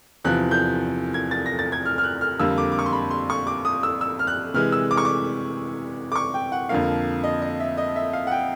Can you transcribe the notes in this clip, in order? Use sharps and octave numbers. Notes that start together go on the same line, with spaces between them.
E2 C3 F3 F#6
G6
G#6
A6
A#6
A6
G#6
F6
F6
F#6
F6
F2 D3 G3 A#3 E6
D6
D6
C#6
C6
B5
C6
C#6
D6
D#6
E6
E6
F6
F#6
C3 E3 G#3 F6
E6
D6
C#6
D6
D6
C#6
G5
F#5
F2 D3 F3 A#3 F5
D#5
D#5
E5
D#5
E5
F5
F#5
G5